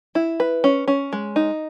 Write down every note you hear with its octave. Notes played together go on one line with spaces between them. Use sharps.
E4
B4
C#4
C#4
G#3
D#4